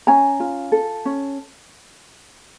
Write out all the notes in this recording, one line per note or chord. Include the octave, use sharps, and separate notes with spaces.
C#4 G#5 A#5
F4
A4
C#4